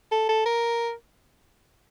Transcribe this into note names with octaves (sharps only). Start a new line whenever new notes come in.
A4
A4
A#4